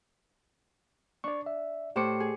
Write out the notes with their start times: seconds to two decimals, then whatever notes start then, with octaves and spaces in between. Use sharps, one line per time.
1.24 D4 D5 C#6
1.46 E5
1.96 A2 G4 C5 D6 C#7
2.20 G#4